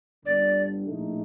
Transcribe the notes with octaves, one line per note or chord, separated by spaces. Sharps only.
G1 G2 D3 D5
A#1 A2 A3 D#4